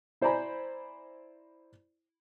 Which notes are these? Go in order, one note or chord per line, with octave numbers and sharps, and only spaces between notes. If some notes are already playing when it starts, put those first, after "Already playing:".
E4 C5 D5 G#5 A#5 B5